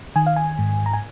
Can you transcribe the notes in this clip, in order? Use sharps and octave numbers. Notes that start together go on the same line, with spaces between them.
D#3 G#5
F5
G#5
G#2
A#5
G#5